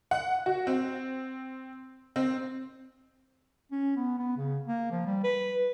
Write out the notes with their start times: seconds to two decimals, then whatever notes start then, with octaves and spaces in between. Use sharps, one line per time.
0.11 F#5
0.46 F#4
0.67 C4
2.16 C4
3.71 C#4
3.96 B3
4.19 B3
4.37 C#3
4.68 A#3
4.91 F3
5.06 G3
5.24 B4